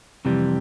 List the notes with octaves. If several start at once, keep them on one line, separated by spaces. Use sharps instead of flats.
F2 C3 E3 G3